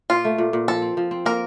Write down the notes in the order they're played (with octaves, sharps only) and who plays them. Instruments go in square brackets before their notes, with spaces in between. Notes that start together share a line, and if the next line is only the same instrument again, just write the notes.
[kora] A#2 [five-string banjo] F4
[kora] A3
A#2
A#2
[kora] F3 [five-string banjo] A4
[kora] C4
F3
C4
[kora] A#3 [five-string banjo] A#4